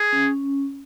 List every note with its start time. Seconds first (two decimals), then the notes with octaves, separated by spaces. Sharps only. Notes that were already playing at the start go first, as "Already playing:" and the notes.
Already playing: G#4
0.13 C#4